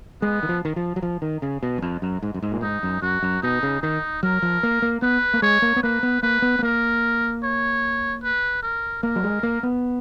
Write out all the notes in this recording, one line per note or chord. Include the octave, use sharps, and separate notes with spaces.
G#3 B3
D#3
F3
D#3
F3
F#3
F3
D#3
C#3
B2
F#2
F2
F#2
G#2
F#2
G#2
A#2
G#2 D#4
F#2
F#2 F#4
F#2
B2 D#4
C#3
D#3 D#4
F#3 A#4
F3
A#3
A#3
B3 B4
A#3
G#3 C#5
A#3
B3
A#3 B4
B3
A#3 B4
B3
B3
A#3 A#4
C#5
B4
A#4
A#3 A#4
F#3
G#3
A#3
B3